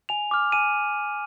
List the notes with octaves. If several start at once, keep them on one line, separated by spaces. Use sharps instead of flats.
G#5 F7
D6 F6
G#5 D#7